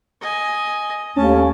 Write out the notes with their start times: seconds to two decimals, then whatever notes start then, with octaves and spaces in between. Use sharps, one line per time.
0.21 D#5 G#5
1.16 D#2 A3 C#4 A5